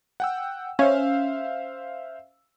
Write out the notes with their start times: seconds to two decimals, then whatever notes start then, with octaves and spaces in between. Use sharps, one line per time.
0.20 F#5 G5 E6
0.79 C#4 C5 E5 F5